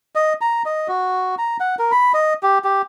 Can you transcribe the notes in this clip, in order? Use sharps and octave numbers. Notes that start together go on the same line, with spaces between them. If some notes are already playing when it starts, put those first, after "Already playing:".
D#5
A#5
D#5
F#4
A#5
F#5
A#4
B5
D#5
G4
G4